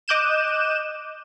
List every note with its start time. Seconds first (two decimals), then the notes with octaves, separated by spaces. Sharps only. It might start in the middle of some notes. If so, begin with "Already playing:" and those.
0.08 D#5 D6 F#6 G6 D#7 E7